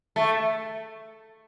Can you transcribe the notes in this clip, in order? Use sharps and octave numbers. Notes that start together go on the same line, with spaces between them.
A3